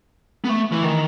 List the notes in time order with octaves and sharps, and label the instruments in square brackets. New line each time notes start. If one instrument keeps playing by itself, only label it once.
[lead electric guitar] B3
A3
E3
D#3